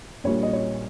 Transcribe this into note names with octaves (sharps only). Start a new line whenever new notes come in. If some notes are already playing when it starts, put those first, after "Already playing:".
A#1 A#2 G3 C#5
D#5
C#5